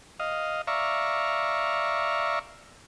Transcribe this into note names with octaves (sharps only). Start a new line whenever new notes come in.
D#5 F5
D5 E5 F5 A#5 C#6